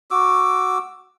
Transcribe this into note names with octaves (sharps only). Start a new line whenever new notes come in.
F#4 D6 E6